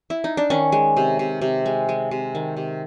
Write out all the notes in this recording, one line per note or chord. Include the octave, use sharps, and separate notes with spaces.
E4
D#4
D4
D#3 C#4
G#3
C3
C3
C3
G#3
G#3
C3
D#3
C3